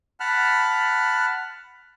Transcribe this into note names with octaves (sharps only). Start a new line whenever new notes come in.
F#5 A5 B5 F6 F#6